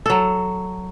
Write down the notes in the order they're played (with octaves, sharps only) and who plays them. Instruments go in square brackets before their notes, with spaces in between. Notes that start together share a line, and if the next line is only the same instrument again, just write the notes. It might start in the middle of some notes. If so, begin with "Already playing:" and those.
[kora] F#3 A4